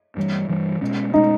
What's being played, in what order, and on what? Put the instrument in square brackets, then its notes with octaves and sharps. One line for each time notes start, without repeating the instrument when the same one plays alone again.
[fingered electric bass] G2 E3 G3
G2 E3 G3
B2 G#3 C#4
[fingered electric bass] B2 G#3 C#4 [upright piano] D#4